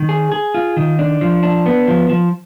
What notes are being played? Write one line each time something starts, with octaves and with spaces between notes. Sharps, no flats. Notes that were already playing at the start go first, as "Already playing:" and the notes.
Already playing: D#3
G#4
G#4
F4
D#3
D4
F3
D4
B3
F3
F3